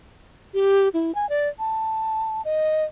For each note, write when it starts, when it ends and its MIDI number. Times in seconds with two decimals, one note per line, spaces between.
0.54 0.89 67
0.94 1.14 64
1.15 1.28 80
1.29 1.48 74
1.59 2.42 81
2.45 2.85 75